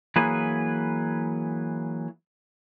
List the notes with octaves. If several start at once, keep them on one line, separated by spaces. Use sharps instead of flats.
E3 F#3 A#3 G#4 B4